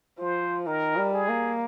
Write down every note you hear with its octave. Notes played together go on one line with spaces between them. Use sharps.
F3 C5
D#3 A#4
G3
G#4
A#3